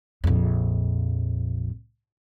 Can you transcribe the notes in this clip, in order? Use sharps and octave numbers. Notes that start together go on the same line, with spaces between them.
A#1 F2